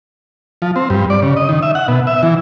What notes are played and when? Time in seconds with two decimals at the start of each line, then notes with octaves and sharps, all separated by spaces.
0.62 F3
0.76 C4
0.90 G2
1.10 D5
1.22 C#3
1.37 D#5
1.49 D#3
1.63 E5
1.75 F#5
1.88 B2
2.07 E5
2.23 E3